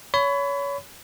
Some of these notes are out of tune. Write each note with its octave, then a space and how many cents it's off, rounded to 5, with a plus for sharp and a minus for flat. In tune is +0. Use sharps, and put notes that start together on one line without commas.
C#5 +25 B5 +25